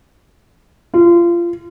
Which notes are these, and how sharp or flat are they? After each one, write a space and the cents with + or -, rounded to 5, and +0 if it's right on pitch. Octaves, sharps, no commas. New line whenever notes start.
F4 -25